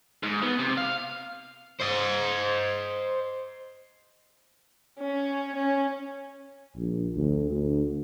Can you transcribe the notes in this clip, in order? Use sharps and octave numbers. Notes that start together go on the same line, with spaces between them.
G#2
B3
C3
F5
C5 D#5
C#4
C#4
A#1
D2
D2